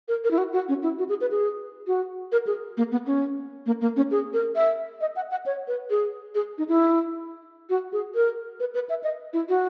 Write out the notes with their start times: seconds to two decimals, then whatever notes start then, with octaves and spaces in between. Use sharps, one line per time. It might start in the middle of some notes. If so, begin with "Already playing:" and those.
0.08 A#4
0.24 A#4
0.31 E4
0.38 F#4
0.53 F#4
0.68 C#4
0.82 E4
0.98 F#4
1.09 G#4
1.21 B4
1.31 G#4
1.87 F#4
2.32 A#4
2.47 G#4
2.77 A#3
2.91 B3
3.06 C#4
3.66 A#3
3.81 A#3
3.96 C#4
4.11 G#4
4.33 A#4
4.56 E5
5.01 D#5
5.16 F#5
5.31 F#5
5.46 C#5
5.68 B4
5.90 G#4
6.35 G#4
6.58 D#4
6.68 E4
7.69 F#4
7.93 G#4
8.15 A#4
8.60 B4
8.74 B4
8.89 E5
9.03 D#5
9.33 E4
9.49 F#4